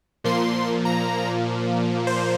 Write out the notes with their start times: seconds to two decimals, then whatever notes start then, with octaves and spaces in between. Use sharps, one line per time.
0.24 A#2 F3 A#3 C6
0.85 A#5
2.07 C5